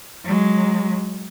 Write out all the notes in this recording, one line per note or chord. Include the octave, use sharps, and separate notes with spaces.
F#3 G#3